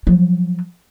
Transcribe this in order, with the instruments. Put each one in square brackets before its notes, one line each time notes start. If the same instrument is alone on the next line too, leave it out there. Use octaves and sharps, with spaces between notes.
[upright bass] F3 F#3